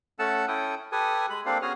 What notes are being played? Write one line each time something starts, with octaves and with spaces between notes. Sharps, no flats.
A3 C#4 A4 F#5 A5 E6
C#4 E4 A4 G5 D#6
G4 A4 B4 G#5 D#6
G#3 B5
A#3 C4 D4 G4 A4 F5
B3 C#4 F#4 G#4 D#6 F6